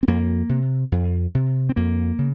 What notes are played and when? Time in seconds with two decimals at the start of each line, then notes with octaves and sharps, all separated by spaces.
0.03 C4
0.08 F2 A#3
0.49 C3
0.92 F2
1.35 C3
1.69 C4
1.76 F2 A#3
2.18 C#3